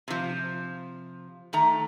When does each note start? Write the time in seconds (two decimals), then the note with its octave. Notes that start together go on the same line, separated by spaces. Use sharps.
0.08 C3 F3
1.53 D#3 A3 A#5